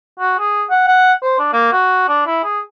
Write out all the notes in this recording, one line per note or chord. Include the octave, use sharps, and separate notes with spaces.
F#4
G#4
F#5
F#5
C5
D4
A#3
F#4
D4
E4
G#4